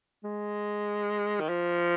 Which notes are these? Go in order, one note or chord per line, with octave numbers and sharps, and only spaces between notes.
G#3
D#3
F3